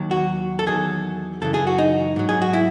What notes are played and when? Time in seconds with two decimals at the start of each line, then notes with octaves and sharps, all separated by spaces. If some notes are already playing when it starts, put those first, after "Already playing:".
Already playing: D#2 D#3 F#3
0.11 F#4
0.59 A4
0.66 E2 D#3 F#3 G#4
1.41 F#2 C#3 E3 A4
1.54 G#4
1.67 F#4
1.78 D#4
2.16 G#2 F#3
2.29 G#4
2.42 F#4
2.53 E4